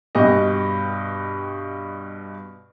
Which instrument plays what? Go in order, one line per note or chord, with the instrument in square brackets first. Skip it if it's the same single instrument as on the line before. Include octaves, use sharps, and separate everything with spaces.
[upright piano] G2 B2 G4 D#5